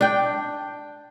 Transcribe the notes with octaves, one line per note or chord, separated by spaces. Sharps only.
D4 G5